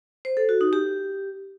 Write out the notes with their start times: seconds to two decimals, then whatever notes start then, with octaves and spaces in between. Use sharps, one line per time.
0.25 C5
0.37 A4
0.49 F#4
0.61 D#4
0.73 G4